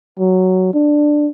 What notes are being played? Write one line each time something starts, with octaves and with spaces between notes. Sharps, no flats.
F#3
D4